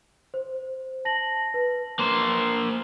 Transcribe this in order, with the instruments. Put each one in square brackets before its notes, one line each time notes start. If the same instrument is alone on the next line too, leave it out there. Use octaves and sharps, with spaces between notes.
[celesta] C5
A5 A#6 F#7
B4
[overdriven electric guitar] A#3 C5